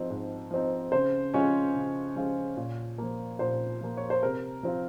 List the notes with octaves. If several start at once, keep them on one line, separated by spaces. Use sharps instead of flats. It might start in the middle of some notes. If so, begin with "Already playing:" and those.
Already playing: G#2 F3 C4 D#4
G#2
F3 C4 D#4
C#3 C5
F3 G#3 C#4 F4 C#5
C#3
F3 G#3 C#4 F4
A#2
F3 A#3
A#2 C5
F3 A#3
C#5
C5
C3 A#4
F3 C4 F4